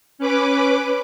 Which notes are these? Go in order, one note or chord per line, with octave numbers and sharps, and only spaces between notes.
C#4 B4 D6